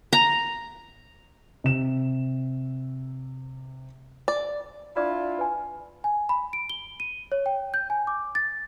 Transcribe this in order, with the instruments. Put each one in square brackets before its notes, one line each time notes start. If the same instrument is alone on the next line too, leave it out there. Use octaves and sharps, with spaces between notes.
[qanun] A#5
[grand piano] C3 E7
[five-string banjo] D5
[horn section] D4 E4 F4 [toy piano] D5 D6
[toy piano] B4 G#5
[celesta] G#5
B5
D7
G7
D#7
C#5
G5
G6
G#5
D6
A6